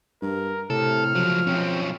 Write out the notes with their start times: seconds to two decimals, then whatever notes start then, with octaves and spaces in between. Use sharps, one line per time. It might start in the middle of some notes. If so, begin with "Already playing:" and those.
0.22 G2 A#4
0.70 A2 C3 A4 F6
1.15 C#2 F3 F#3
1.47 B1 C4 C#4